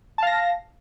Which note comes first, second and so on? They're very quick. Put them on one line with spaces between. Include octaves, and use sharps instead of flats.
A5 F5 A#6